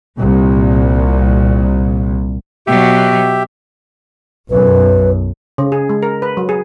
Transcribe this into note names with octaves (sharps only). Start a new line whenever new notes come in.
C2 A#2
B2 F#3 G4 E5
B1 F#2 B4
C#3
G#4
G#3
A#4
B4
F#3
G#4